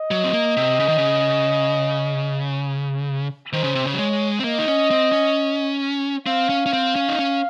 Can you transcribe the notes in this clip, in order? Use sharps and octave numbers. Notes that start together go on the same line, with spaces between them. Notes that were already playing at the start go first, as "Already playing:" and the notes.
Already playing: D#5
F#3
C4
A#3
C3
C#3
D#3
C#3
D#3 C5
C#3
C3
C#3
F#3
G#3 C#5
C4
A#3 D#5
D#4
C#4
C4
C#4
C4 F5
C#4
C#4
C4
C#4
D#4
C#4